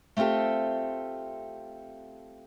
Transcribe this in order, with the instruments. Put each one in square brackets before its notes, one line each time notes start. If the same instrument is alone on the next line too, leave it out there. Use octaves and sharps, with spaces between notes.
[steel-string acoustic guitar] A3 C4 F4 G4 A4